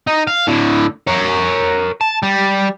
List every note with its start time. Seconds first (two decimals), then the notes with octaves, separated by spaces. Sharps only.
0.07 D#4
0.27 F5
0.47 A2 D3
1.07 A#4 C#5
2.01 A5
2.23 G3